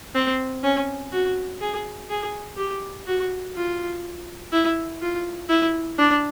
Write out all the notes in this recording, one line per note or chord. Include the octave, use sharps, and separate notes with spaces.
C4
C#4
F#4
G#4
G#4
G4
F#4
F4
E4
F4
E4
D4